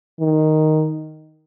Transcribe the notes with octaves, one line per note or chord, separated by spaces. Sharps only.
D#3